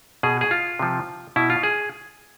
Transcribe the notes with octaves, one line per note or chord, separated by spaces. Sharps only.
B2 G#4
G#4
F4
C3 F3
B2 E4
F4
G#4